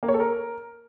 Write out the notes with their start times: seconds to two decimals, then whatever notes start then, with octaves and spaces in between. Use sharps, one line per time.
0.03 A#3
0.08 C#5
0.14 A4
0.20 A#4